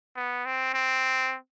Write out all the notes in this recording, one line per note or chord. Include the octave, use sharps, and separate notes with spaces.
B3
C4
C4